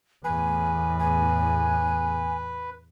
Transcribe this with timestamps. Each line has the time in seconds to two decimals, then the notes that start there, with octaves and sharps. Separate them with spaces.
0.24 E2 A2 B4 G#5
0.99 G#5